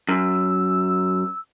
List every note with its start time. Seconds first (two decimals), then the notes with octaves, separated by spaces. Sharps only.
0.08 F#2 E6